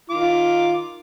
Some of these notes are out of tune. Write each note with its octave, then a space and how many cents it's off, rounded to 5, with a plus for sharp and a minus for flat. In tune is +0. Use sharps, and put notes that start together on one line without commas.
D#3 +0 F4 +0 D6 +0